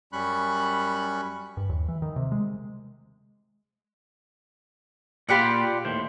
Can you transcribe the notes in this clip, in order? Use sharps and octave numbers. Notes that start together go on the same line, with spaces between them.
F#2 G3 C#4 B5 C#6 F#6
G2
D#2
E3
D#3
C3
G#3
A#2 F4 G4 D5 F#5 B5
D#2 A2 C5